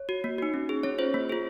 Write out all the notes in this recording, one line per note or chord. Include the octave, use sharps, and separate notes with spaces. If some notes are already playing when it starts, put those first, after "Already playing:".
Already playing: C#5
F#4
A#3
D#4 F#4
C#4
G#4
C#4 C#5
F4 G#4 C5
A#3
F4 G#4